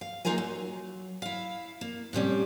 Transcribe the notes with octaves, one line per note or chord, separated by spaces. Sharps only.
F5
A#3 D#4 F4 G#4 A#4 G#5
F#3
E4 F5
A#3
A2 C3 G3 C#4